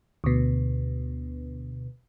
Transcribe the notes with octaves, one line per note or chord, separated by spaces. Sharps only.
D2 B2